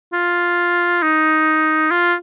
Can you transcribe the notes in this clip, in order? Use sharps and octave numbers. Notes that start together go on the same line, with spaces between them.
F4
D#4
F4